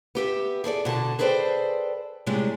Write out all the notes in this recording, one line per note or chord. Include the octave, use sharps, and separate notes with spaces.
B3 G4 E5
G#4 A4 C5 D5
B2 D3 C#5 A5
G#4 A4 B4 C5 D5 G5
A2 C3 G3 G#3 D4